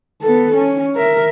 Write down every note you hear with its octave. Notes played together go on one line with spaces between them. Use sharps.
B3 A4
C#4
A#4 E5